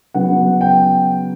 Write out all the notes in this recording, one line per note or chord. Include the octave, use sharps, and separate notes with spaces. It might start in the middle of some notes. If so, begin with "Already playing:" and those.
C#3 F#3 B3 F#5
G5